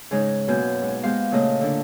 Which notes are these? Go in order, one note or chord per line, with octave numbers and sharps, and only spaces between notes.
G#2 C#3 G#3 D#4
F#2 B2 A#3 G#5 G6
G#2
G#3 B3 G4 C5 F5
A#2 C#3 A3 A#3 D#5 D#6
D3 D4